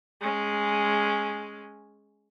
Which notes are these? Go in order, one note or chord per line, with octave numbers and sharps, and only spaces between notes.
G#3 C#4